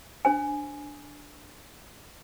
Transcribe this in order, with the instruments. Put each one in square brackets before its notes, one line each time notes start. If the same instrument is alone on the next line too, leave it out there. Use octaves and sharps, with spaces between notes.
[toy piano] D4 C5 G#5